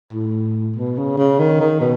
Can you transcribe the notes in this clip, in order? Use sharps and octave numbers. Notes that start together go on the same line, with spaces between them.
A2
B2
C#3
C#3
D#3
D#3
B2